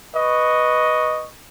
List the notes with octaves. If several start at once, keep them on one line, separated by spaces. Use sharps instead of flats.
B4 D#5 C#6